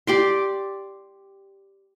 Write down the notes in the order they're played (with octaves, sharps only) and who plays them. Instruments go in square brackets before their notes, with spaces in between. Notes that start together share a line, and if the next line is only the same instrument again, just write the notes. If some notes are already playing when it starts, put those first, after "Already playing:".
[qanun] G4 D5 C6